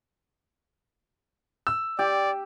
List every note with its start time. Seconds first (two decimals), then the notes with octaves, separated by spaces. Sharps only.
1.67 E6
1.99 G4 D5